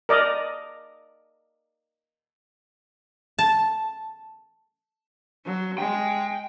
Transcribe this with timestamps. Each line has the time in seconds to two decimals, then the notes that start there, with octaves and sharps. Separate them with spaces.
0.09 A#4 D5 D#5
3.39 A5
5.45 F#3
5.78 G#3 G5